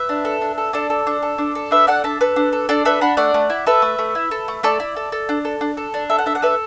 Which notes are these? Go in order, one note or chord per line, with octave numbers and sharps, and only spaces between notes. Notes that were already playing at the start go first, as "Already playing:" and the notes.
Already playing: B4 E5
D4
A4
D4
A4
D4 A4 D5
A4
D4
A4
D4
A4
D4 B4 E5
A4 D5 F#5
D4 E5 A5
A4 B4
D4
A4
D4 A4 D5
A4 B4 E5
D4 F#5 B5
A3 D5 F#5
A3
E4
A4 B4 E5
A3
A3
E4
A4
A3
A3 A4 D5
E4
A4
A4
D4
A4
D4
A4
D4
A4 E5
F#5
D4 E5
F#5
A4 B4 E5